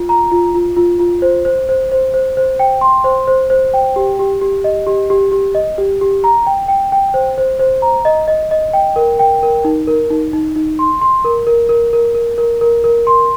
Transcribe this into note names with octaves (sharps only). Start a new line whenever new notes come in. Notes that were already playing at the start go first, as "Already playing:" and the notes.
Already playing: F4
A#5
F4
F4
F4
F4
C5
C5
C5
C5
C5
C5
G5
C6
C5
C5
C5
G5
G4
G4
G4
D#5
G4
G4
G4
D#5
G4
G4
A#5
G5
G5
G5
C5
C5
C5
A#5
D#5
D#5
D#5
G5
A#4
G5
A#4
D#4
A#4
D#4
D#4
D#4
C6
C6
A#4
A#4
A#4
A#4
A#4
A#4
A#4
A#4
C6